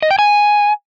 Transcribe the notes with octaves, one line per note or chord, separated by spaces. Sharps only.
D#5
G5
G#5